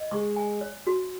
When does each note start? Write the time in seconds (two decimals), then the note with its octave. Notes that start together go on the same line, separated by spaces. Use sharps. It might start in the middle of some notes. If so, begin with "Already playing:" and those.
Already playing: D#5
0.11 G#3 C#6
0.36 G#5
0.61 C#5
0.87 F#4